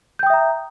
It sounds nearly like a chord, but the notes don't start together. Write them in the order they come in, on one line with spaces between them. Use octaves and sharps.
G6 G5 D#6 E5 A#5